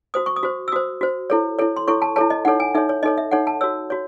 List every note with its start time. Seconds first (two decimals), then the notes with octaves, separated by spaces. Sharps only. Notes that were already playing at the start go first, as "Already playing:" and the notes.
0.14 F#4 C5 D#6
0.26 C#6
0.36 D#6
0.43 F#4 C5
0.68 E6
0.72 F#4 C5 D#6
1.01 F#4 C5
1.30 E4 A4 C#5
1.59 E4 A4 C#5
1.76 C6
1.88 E4 A4 C#5 C#6
2.02 A5
2.16 E4 A4 C#5 A5
2.30 D#5
2.45 D#4 A4 C#5 F#5
2.60 G#5
2.75 D#4 A4 C#5 E5
2.89 C#5
3.03 D#4 A4 C#5 D#5
3.18 E5
3.31 D#4 A4 C#5 F#5
3.47 A5
3.61 F#4 C#5 E6
3.90 F#4 C#5